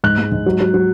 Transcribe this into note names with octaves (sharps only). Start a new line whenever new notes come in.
G#2 F#6
G#3
G#2
F#3
F#3
F#3